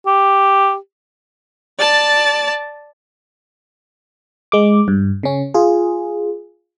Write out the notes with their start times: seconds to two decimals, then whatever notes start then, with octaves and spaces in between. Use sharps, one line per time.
0.07 G4
1.79 D5 A5
4.52 G#3 D6
4.88 G2
5.23 C#3 C#4
5.54 F4 G#4